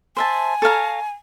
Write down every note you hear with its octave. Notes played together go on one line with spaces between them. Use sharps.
C5 E5 G#5 A5
A4 C#5 F5 A#5